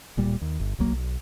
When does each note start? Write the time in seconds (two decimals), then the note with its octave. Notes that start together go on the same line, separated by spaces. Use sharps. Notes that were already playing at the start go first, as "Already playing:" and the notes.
0.17 D1 A#2 G3
0.41 D#2
0.60 G1
0.78 D1 B1 F#3 A#3
0.92 B1